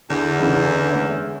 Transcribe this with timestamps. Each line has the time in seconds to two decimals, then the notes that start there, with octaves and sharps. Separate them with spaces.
0.10 E2 D3
0.39 C#3 E3 D#4
0.90 G#3 C#4 E5